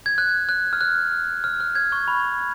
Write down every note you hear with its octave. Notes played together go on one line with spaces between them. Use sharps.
G#6
F#6
F#6
F6
F#6
F6
F#6
G#6
C#6
B5